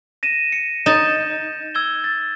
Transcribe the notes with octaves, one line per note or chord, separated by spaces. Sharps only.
A#6 D#7 E7
C#7
D#4 G6 A6 E7
E6 G#6 G7
A6